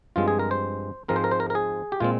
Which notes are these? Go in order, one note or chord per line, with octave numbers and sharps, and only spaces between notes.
G2 F3 G#3 C4 F4
G#4
A#4
C5
G#2 F3 G#3 C4 A#4
C5
A#4
C5
A#4
A#4
G#4
G4
A#2 G#3 C4 F4